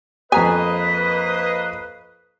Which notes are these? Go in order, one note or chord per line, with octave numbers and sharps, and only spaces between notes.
F2 A#3 B4 C5 D#5 G#5 A#5 D#6